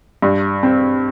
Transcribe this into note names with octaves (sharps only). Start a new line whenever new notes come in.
G2
C4